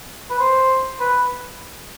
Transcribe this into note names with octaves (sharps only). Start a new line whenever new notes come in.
B4
C5
B4